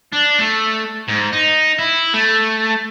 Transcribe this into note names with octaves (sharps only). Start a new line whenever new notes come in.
D4
A3
G#2
D#4
E4
A3